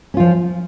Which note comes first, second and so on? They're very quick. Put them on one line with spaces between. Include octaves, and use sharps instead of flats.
C#4 F4 F3